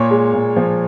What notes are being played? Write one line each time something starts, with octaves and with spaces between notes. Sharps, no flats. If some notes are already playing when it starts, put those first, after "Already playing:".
Already playing: A#2 C#5
G#3
A#2
F3